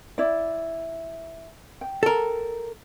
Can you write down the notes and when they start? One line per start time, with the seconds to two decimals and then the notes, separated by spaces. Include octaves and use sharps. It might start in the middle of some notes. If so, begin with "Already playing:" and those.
0.18 E4 D5
1.81 G5
2.03 A4 A#4